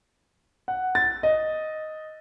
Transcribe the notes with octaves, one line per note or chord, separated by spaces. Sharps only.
F#5
A6
D#5